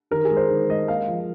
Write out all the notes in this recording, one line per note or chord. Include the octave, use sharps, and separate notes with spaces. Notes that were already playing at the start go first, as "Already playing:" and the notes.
D#3 A#4
G#4
G#3
C5
D#3
G#3 D#5
A#3 F5
F3